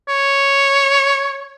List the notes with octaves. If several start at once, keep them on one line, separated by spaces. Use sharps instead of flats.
C#5